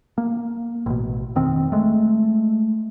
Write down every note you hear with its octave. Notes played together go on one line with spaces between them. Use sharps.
A#3
A1 B2
F1 D#3 C4
G#3 A3